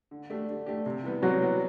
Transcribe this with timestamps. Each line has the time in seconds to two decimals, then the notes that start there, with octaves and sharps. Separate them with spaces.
0.11 D3
0.30 A3 D4 G4
0.49 D3
0.66 A3 D4 G4
0.86 C3
1.04 E3 G3 B3
1.23 C3 F#3 F#4
1.41 E3 G3 B3